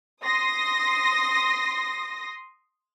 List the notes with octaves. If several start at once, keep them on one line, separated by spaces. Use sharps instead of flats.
C6 D#6 A#6